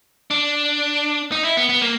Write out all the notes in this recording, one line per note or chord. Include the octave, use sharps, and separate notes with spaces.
D4
D#4
E4
B3
B3
A#3